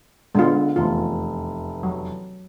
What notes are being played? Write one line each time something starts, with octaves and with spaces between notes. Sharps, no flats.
D3 G#3 B3 F4
F1 E2 F4
F#3